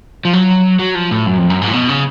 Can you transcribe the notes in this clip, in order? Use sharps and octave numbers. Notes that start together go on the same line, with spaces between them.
F3
F#3
F#3
F3
A2
F#2
F2
F#2
G#2
A2
B2
C#3